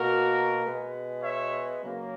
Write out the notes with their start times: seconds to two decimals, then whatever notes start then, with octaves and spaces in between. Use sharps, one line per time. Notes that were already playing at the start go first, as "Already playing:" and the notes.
Already playing: B2 A#3 F#4 A#4
0.63 B2 G#3 B3
1.22 C#5 E5
1.82 C#3 F#3 A#3